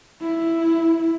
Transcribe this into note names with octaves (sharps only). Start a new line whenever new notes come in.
E4